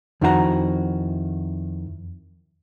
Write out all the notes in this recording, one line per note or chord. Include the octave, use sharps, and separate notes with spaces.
F2 D#3 E4 F#4 G4 A#5